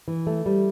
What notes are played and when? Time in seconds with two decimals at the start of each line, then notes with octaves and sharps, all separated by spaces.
0.08 E3
0.27 A3
0.46 G3